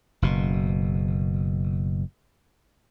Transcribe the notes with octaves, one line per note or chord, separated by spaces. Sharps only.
F#1 B2